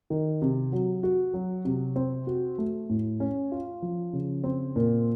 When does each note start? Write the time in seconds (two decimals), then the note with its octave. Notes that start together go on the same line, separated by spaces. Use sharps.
0.10 D#3
0.42 C3
0.72 F#3
1.03 F#4
1.34 F#3
1.65 C3
1.96 C4
2.27 F#4
2.58 A3
2.89 A2
3.20 C#4
3.52 F4
3.82 F3
4.13 C#3
4.44 C4
4.76 A#2